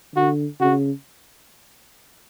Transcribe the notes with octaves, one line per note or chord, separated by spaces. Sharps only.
D3 F#4
C#3 F#4